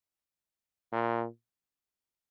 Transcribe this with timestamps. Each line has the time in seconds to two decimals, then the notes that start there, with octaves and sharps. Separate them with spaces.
0.92 A#2